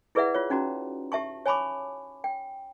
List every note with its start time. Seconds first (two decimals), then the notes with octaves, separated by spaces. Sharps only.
0.15 E4 G#4 B4 D5 E5 F#5
0.35 F4 C#5
0.50 C#4 D#4 F#4 A#5
1.12 G4 E5 A5 C#6
1.46 C#5 G#5 A5 B5 C#6 D6
2.24 G5